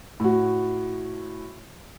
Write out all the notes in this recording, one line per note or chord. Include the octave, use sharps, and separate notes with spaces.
A2 F#4